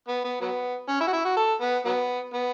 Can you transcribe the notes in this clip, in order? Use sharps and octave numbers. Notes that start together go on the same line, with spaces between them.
B3
B3
F#3 B3
C#4
E4
F#4
E4
F#4
A4
B3
F#3 B3
B3